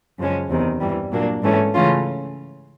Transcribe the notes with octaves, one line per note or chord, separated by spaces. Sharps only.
F#2 C#3 F3 G#3 C#4
E2 C3 D#3
G2 E3 G3
A#2 F#3 A#3 D4
G#2 E3 A3 C#4
C#3 E3 A3 C#4 F4